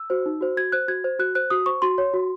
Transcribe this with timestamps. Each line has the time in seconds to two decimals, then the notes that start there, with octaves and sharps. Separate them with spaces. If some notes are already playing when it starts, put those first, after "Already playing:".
Already playing: E6
0.10 F#4 C5
0.26 D#4
0.41 F#4 C5
0.57 F#4 G#6
0.72 C5 F#6
0.88 F#4 G#6
1.04 C5
1.19 F#4 F#6
1.35 C5 F#6
1.50 F#4 D#6
1.66 C5 C#6
1.82 F#4 C6
1.98 C#5
2.14 F#4